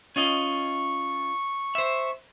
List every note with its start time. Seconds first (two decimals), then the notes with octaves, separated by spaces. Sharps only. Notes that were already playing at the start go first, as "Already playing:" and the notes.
0.16 C#4 F4 D#5 C#6
1.75 C5 E5